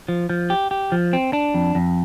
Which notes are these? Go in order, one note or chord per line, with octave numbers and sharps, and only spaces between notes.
F3
F3
G4
G4
F3
C4
D4
F2
F2